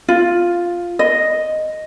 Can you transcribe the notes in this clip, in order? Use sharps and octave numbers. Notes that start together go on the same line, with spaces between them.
F4
D#5